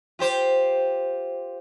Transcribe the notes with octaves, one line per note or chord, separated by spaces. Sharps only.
F4 G4 C5